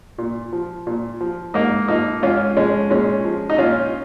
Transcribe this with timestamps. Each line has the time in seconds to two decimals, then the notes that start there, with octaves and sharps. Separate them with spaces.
0.18 A#2
0.52 F3
0.87 A#2
1.20 F3
1.54 G#2 A#3 D#4
1.88 F3 A#3 D#4
2.23 G#2 C#4 F4
2.57 F3 G#3 C#4
2.90 A#2 G#3 C#4
3.25 F3
3.50 D#4
3.58 A#2 C#4 F4